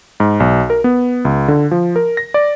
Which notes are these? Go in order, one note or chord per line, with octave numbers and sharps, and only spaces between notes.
G#2
B1
A#4
B3
C#2
D3
F3
A#4
A#6
D5